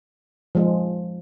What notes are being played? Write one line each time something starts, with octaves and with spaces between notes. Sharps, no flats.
F3 G#3